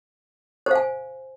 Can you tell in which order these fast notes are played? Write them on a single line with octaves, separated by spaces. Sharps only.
C5 F5 G#5